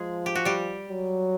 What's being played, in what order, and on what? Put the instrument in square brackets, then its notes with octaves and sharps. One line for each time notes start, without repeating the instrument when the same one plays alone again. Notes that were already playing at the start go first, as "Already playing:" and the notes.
Already playing: [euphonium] F3 [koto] G#3 G#4
[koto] G4
F#4
G3 G4
[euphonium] F#3